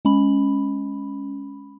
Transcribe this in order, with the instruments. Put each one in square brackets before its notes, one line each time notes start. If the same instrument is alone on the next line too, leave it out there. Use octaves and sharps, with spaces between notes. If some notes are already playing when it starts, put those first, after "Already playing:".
[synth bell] G#3 C#4 B5